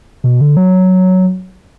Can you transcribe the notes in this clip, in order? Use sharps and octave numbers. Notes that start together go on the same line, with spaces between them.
B2
D3
F#3